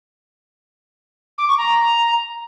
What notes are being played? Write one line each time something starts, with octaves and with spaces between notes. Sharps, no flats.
D6
C#6
A#5